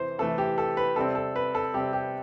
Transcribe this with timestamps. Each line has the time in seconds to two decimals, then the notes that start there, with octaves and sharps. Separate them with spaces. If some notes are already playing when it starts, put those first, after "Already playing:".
Already playing: C3 E3 C5
0.18 C3 E3 A3 A4
0.38 G4
0.58 A4
0.77 B4
0.96 C3 G3 C4 A4
1.15 A4
1.36 B4
1.55 A4
1.74 C3 G3 C4 G4
1.93 G4